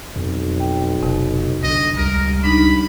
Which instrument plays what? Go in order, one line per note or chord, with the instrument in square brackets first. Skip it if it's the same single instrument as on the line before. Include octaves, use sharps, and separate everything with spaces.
[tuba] B1 [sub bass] F2
[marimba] G5
[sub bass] D#1 [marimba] F2 C3
[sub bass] B1 [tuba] D3 [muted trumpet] D#5
[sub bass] C#2 [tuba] G3 [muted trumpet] A#4
[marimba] D4 D#4 [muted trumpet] B5